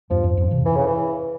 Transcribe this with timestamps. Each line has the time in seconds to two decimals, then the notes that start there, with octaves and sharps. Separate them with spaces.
0.10 E2 G2 F3
0.24 F2
0.37 F2 G#2
0.51 C3 E3
0.65 E3
0.76 C#3
0.87 E3